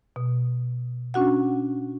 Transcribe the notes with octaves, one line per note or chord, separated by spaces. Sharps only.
B2
C#4 D4 F#4 F#5